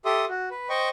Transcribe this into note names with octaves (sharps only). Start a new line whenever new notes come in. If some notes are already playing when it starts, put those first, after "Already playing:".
G4 A4 E5 C6 D#6
F#4
B4
C5 D#5 G5 C#6